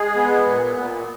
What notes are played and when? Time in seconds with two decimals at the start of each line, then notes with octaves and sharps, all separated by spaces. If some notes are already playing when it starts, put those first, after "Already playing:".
Already playing: G#3 G#4
0.16 B3
0.46 A#2
0.77 A#2